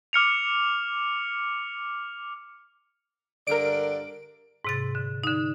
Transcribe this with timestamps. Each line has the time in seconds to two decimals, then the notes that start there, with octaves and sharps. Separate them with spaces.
0.13 D6 F6 C#7 F7
3.47 G2 D3 A#4 D5 D7
4.65 G#2 C3 A6
4.95 D3
5.24 D3 D#4